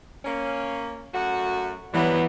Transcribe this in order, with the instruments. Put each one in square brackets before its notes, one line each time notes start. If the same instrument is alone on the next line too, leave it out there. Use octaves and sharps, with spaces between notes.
[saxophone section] A#3 C#4
F#2 A3 F#4
[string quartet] E3 B3 [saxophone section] F#3 G3